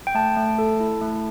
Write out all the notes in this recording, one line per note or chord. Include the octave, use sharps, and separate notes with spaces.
G5
A3 A5
A3
A4
E4
A3